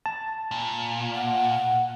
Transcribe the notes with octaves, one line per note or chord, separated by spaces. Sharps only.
A5
A#2
F#5